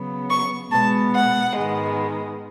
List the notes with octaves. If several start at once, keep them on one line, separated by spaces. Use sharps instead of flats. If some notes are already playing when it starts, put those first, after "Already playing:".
Already playing: C#3 F#3 B3
C#6
B2 G#3 B3 A5
F#5
G#2 D#3 G#3 B3